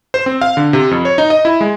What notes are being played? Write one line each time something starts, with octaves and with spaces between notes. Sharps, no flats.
C5
C4
F5
D3
C3
F2
C#5
D#4
D#5
E4
G#3